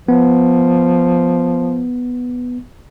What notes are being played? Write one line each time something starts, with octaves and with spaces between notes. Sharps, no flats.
F3 B3